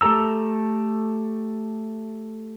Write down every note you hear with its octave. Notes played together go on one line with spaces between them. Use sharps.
A3 G4 A4 A#5 E6